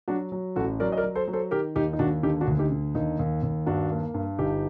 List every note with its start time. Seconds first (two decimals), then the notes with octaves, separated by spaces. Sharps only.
0.08 F#3 D4 F#4
0.32 F#3
0.56 A1 F#4 A4
0.80 F#3 A#4 D5
0.92 D#5
0.97 A#4 D5
1.03 F#3
1.15 A4 C5
1.27 F#3
1.33 A4 C5
1.51 D#3 G4 A#4
1.76 D#2 D#4 G4
1.93 D#4
1.99 D#2 D4 F#4
2.23 D3 D#4 G4
2.41 D4 F#4
2.47 D2
2.59 D#4 G4
2.71 D3
2.95 D#2 D#4
3.19 D#2
3.43 D#2
3.66 G2 D4 F#4
3.90 A#3
4.14 G2
4.38 G1 D#4 G4